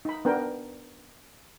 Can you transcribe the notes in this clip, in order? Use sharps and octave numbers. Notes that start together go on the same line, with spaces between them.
D#4 B5
B3 D4 A#4 G5